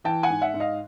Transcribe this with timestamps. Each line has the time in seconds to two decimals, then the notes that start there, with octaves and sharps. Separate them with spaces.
0.04 E3 G5 A5
0.23 F#5 G#5
0.30 G#2
0.42 E5 F#5
0.54 G#2
0.60 D#5 F5